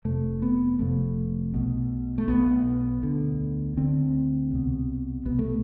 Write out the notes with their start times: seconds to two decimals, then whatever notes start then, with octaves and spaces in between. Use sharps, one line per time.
0.05 F1 F2 C3 A3
0.42 B3
0.79 F1 F2 C3 A3
1.54 B1 B2
2.18 A3
2.28 B1 B2 B3
3.03 D2 D3
3.77 D2 D3 C4
4.51 C2 B2
5.25 C2 B2 B3
5.39 A3